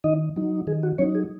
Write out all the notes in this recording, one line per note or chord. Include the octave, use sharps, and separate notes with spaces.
D#3 D#4 D#5
F#3 D#4
D#3 G#4
F#4
F#3 C#4 D#4 C#5
G#4